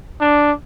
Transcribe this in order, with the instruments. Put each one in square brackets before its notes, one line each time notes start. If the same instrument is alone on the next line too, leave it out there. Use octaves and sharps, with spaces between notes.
[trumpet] D4